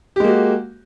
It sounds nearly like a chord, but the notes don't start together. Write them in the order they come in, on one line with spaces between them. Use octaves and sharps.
G4 G#3 A#3 F#4